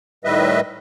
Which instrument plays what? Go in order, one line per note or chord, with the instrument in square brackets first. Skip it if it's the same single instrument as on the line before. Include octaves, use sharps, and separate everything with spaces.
[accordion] A2 D#3 G3 B4 D#5 E5